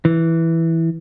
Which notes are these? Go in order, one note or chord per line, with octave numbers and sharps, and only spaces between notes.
E3